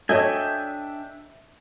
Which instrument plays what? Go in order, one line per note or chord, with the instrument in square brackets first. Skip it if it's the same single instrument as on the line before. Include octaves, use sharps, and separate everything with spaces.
[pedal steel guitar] D4 G5 G#5 [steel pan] A4 C#5 [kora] D#5 [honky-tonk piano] E5